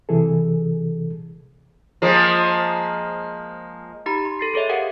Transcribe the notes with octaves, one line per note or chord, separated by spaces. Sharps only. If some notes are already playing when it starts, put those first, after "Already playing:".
C3 E3 G#4 A4
F3 G#3 A#3
D#4 G4 A#5 B5
C6
A4 A6 C7
G#4 A4 C#5 D#5 E5
G4 A#4 D#5 F5 F#5